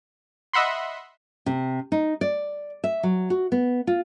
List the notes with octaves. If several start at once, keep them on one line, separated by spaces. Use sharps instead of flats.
D#5 E5 F#5 B5 C6
C3
D#4
D5
E5
F#3
F#4
B3
F4